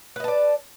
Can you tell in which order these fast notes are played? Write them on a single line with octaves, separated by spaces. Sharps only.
B4 D#5 A5 D5